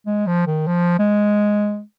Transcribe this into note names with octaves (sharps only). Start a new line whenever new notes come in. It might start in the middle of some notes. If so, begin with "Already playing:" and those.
G#3
F3
D#3
F3
G#3